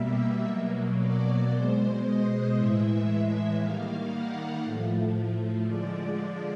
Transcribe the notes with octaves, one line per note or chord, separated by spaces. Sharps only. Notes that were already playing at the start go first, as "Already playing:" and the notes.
Already playing: B2 G3 A#3 E5
B2 F#3 A#3
D5
B2 G#3 C5
D#5
A2 E3 G#3 E5
D#3 G3 A#3 F5
F#5
A2 F3 A3
D3 F3 G#3 D5